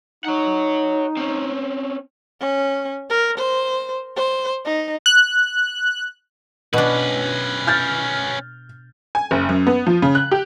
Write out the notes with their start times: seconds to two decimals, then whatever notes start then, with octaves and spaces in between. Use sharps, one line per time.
0.25 D#4 C#5 F#5
1.17 C4 C#4
2.41 C#4
3.10 A#4
3.38 C5
4.16 C5
4.65 D#4
5.06 F#6
6.74 B2 C#4 D4 B4
7.67 F6 G6 A6
9.15 G#5
9.31 F#1
9.49 F#2
9.67 B3
9.87 F3
10.02 C#3
10.15 F#6
10.32 G4